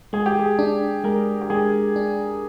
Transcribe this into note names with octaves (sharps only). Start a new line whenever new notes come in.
G#3 G#4
G4
G#4
D4
G#3 A#4
G4
G#3 G#4
D4